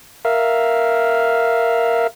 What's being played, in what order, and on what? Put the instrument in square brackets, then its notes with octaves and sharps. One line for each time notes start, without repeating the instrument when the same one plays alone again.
[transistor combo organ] A#4 E5 F5